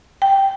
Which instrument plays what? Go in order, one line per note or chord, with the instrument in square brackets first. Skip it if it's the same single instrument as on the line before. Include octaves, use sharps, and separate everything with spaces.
[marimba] G5